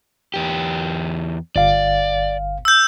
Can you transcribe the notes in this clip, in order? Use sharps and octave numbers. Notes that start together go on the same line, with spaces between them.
E2 G4
G1 D5 F5
E6 G6